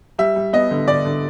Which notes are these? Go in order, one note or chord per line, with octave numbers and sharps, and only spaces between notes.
G3 E5
G3
B3 D#5
D3
D3 D5
D3